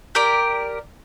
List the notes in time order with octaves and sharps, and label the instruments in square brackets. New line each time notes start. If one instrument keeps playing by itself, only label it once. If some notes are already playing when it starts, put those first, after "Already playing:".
[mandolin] G4 A#4 D5